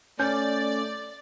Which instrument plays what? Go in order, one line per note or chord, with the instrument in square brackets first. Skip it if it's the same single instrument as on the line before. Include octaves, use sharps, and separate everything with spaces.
[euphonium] A3 [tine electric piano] C#4 [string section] D5 [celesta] G6